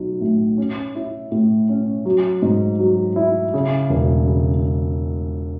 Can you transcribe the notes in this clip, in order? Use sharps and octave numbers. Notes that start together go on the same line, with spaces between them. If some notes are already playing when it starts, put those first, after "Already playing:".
Already playing: B1 F#3
A2
C#4
E4
A2
C#4
F#3
G#2
F#3
E4
C#3
E1
C#3